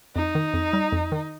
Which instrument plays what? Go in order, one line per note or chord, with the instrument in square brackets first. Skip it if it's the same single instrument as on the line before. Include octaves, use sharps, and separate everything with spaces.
[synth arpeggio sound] F2 [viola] D#4
[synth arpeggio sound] D#3
F2
G3
F2
D#3